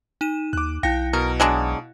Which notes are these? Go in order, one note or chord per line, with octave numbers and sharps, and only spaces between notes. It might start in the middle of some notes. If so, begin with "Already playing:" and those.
D#4 D#7 E7
D#2 D6 F#6
B1 E4 F5 G5 A#6 C#7
B2 A#4
F#3 G#3 D4